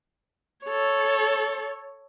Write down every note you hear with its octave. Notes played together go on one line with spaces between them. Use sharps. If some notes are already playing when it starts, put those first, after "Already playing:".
A4 C#5